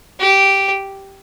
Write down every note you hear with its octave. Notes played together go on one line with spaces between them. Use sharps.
G4